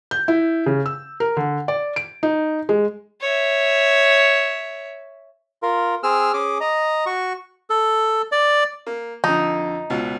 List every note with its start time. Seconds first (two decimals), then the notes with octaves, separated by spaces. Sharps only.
0.11 G6
0.28 E4
0.66 C#3
0.86 E6
1.20 A#4
1.37 D3
1.68 D5
1.96 D7
2.23 D#4
2.69 G#3
3.21 C#5 E5
5.63 F4 A#4
6.03 C4 G#4 E6 F6
6.33 C#4 G#4 D6
6.61 D#5 A#5
7.06 F#4 C#6
7.70 A4
8.32 D5
8.86 A#3
9.24 F2 D3 D#4
9.90 C#2 B2